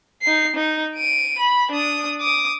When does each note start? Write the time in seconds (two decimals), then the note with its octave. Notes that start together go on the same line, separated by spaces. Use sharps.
0.22 D#4 C7
0.55 D#4
0.95 D7 D#7
1.38 B5
1.71 D4 D#6
2.20 D6 D#6